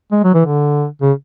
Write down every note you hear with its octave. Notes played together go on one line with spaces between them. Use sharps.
G#3
F#3
E3
D3
C#3